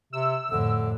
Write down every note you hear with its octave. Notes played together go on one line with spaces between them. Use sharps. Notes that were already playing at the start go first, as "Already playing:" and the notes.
C3 E6
F2 A2 D3